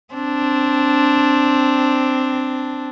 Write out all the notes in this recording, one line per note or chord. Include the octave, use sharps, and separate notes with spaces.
C4 D4